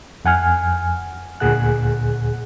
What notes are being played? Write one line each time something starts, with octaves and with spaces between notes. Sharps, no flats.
F2 F#5 G#5 F6
D2 A#2 G#4 F#5 F#6